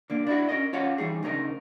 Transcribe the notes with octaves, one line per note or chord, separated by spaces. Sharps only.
D3 A#3
D4 E4 F#4
C#4 A#4 D#5
C#4 F4 C#5 F5 F#5
E3 G3 D#4 G#4
D2 C#3 D#4 A#4 D#5